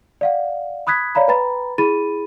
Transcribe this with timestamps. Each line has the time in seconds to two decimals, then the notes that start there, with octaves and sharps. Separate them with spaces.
0.21 D5 F5 F#5
0.87 B5 D#6 F#6 G#6 B6
1.15 C#5 D5 F5 A#5 B5
1.28 B4 G5 A#5 B5 A6
1.78 E4 G#4 B5 A6 D#7